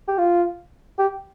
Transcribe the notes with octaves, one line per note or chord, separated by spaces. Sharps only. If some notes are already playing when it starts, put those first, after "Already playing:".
G4
F4
G4